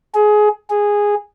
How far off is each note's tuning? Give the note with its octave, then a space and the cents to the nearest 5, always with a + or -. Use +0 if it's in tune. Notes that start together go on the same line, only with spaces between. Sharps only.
G#4 +20
G#4 -10